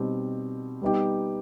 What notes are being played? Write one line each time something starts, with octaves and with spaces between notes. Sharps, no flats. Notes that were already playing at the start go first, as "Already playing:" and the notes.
Already playing: B2 G3 C4 D#4 G4
G3 B3 D#4 G4